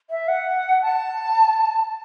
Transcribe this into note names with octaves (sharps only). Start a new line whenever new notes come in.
E5
F#5
A5